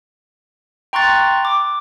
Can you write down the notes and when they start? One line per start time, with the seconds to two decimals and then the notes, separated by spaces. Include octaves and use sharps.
0.93 G5 A#5 C6 C#6 F#6 A6
1.45 D6